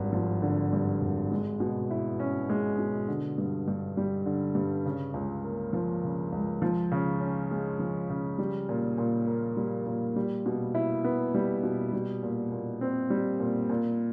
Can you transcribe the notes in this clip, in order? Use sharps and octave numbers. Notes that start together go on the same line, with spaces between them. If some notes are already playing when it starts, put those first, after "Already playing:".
Already playing: G#1 G2
F3
D3
G2
G#1
G#3
B2
E4
C#4
G#3
B2
D3
G2
G2
G3
D3
G2
C#3
C#2
A#3
F3
C#3
C#2
F3
C#3
C#4
G#3
F3
C#3
G3
A#2
A#2
A#3
G3
A#2
G3
B2
E4
B3
G3
B2
G3
A#2
A#2
C4
G3
A#2
A#2